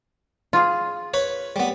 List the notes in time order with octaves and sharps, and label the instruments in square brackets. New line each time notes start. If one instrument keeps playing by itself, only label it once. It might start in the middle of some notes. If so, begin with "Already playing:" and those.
[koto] F4 G#4
[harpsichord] B4 C#5
G3 B3